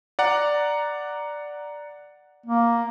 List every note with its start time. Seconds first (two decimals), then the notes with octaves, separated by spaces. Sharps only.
0.19 D5 F#5 A#5
2.46 A#3